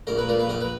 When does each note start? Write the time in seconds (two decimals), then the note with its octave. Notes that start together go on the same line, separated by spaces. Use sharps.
0.07 A#1 A#4
0.18 B4
0.27 A#2 A#4
0.39 B4
0.47 A#1 A#4
0.61 B4